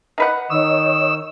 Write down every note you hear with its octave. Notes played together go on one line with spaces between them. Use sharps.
D#4 B4 F#5
D#3 C#5 D#5 E6